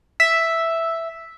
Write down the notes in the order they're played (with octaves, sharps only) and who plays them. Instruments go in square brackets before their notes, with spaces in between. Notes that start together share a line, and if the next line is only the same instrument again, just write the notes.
[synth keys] E5